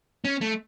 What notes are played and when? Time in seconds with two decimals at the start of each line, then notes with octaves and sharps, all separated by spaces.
0.25 C#4
0.41 A3